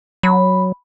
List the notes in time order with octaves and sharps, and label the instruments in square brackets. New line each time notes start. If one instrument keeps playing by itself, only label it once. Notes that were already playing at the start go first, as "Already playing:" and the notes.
[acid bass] F#3 [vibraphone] B5